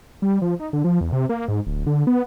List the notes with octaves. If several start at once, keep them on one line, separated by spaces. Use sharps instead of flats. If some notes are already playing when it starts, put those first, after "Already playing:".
G3
F3
D#4
D3
F3
E2
C3
A#3
G#2
D1
D3
B3